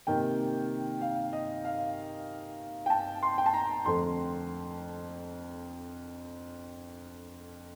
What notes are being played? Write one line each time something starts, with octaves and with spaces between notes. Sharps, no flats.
C3 D#3 A#3 G5
F5
D#5
F5
G5
A5
C6
G5
A5
A#5
F2 D3 F3 A3 C6